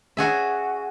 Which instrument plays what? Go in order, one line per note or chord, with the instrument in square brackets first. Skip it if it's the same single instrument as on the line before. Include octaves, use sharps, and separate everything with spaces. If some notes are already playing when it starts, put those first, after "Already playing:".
[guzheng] F#4 G#4 E5